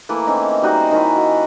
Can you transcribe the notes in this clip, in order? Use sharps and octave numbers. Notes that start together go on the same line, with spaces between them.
E3 A3 A#3
E3 C4 C#4 D#4
G3 D#4 F#4 G#4
D#3 C#4 E4
F#4